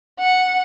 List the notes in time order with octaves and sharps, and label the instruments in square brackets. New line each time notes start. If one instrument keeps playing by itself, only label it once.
[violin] F#5